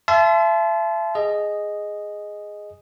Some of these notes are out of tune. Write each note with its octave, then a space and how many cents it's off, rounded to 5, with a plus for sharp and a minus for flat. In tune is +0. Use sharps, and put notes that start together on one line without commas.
E5 +35 A5 -30 C6 -25
G#4 +0 D#5 -5